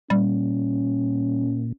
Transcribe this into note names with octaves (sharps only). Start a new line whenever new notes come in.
A#2 G3 C#4